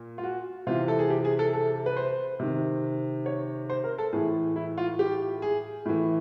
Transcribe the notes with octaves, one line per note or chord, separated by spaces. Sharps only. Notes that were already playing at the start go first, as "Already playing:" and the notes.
Already playing: A#2
F4
F#4
C3 E3 F4
A4
G#4
G4
G#4
A4
A4
B4
C5
C3 D#3
C#5
C5
A#4
A4
A2 E3 G#4
E4
F4
G4
G#4
A2 E3